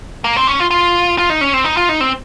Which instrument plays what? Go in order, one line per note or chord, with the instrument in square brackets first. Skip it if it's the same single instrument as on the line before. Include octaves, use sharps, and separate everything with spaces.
[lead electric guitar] A#3
C4
C#4
F4
F4
F4
D#4
C#4
C4
D#4
F4
D#4
C4